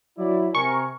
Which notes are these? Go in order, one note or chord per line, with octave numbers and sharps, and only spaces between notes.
F#3 E4 D5
C3 A#4 G#5 C#6